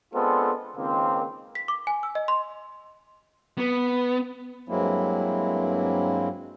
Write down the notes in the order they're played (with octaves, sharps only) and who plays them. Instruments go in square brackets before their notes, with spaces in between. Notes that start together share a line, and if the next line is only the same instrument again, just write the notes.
[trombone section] G#3 B3 C4 D4 F4 A4
C#2 D#3 A#3 C4
[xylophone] B6
D6
G#5
E6
D#5
C6
[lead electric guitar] B3
[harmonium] G2 F#3 G#3 A#3 C4 E4